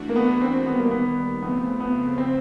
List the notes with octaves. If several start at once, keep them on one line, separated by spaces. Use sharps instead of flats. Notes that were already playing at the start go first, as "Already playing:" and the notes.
Already playing: E3 A3 D4 F#4
A#3
B3
C4
D#2 D#3 G3 B3
A#3
B3
F2 C#3 F3 A3 B3 C4
B3
C4